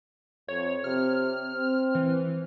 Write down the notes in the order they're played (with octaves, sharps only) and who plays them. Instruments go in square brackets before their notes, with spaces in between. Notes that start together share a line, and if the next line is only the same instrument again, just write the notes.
[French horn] F2 [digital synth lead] C#5
[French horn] C3 [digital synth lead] F6
[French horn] C4
[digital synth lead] E3